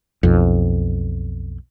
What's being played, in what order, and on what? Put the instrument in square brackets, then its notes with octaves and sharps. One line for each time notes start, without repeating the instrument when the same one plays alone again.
[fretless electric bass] B1 F2